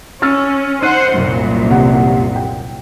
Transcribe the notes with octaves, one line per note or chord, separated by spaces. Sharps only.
C#4 E6 F6 A6
D#4 C5 F#5 F#6 D#7
C2 F#2 A#2
D#2 C3 F#5
G5